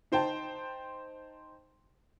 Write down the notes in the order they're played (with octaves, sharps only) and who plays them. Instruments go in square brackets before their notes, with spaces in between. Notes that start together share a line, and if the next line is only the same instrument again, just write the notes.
[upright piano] D#4 C5 G5 A5